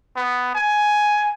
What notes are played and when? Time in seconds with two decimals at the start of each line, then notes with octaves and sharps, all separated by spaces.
0.16 B3
0.55 G#5